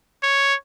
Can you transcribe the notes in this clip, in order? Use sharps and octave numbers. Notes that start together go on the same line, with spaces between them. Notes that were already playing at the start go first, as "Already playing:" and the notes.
C#5